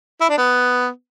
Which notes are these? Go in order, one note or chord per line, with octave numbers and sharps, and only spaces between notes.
E4
D4
B3